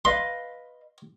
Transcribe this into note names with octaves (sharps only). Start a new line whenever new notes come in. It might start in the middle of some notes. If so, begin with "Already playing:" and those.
B4 D#5 F5 C6